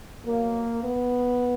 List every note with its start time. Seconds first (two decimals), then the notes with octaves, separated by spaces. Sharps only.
0.24 B2 F#3 A#3
0.84 B3